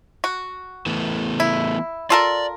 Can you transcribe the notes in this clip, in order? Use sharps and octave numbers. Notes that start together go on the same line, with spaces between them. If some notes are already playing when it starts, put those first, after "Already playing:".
F#4
E3 A3 B3
E4
F4 A4 A#4 D5